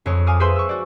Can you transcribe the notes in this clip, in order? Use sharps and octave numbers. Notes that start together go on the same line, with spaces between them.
F2 G#3 C#5
F5 G#5 D6 D#6 F6
G#4 B4 C5 E5 G#5 C6
C#6 E6
F#4 D5